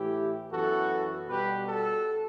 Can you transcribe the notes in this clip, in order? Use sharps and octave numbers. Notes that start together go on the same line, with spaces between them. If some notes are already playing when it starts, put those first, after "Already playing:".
Already playing: A2 E3 A3 E4 G4
F#2 E3 B3 F#4 A4
B2 G3 B3 G4 B4
F#4 A4